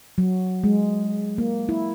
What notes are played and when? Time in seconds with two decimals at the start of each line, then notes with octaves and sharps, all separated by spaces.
0.18 F#3
0.64 G#3
1.38 A#3
1.69 E4